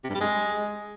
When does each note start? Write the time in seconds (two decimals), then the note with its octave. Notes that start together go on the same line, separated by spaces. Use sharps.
0.04 C3
0.09 G2
0.15 G3
0.20 G#3